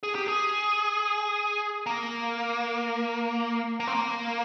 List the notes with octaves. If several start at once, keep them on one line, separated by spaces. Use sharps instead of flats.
G#4
G4
G#4
A#3
A#3
C4
A#3